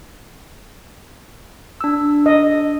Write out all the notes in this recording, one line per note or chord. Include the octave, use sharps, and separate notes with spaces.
D4 E6
D#5